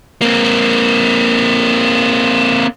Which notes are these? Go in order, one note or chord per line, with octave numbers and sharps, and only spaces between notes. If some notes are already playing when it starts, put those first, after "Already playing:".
A#3 C4